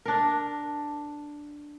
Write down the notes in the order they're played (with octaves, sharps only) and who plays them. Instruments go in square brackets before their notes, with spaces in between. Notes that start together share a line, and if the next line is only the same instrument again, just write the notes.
[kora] D4 A#4